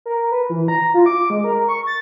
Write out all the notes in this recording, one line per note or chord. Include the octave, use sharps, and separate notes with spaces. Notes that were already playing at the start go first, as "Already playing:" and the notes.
A#4
B4
E3
A#5
F4
D6
G#3
A#4
C#6
A6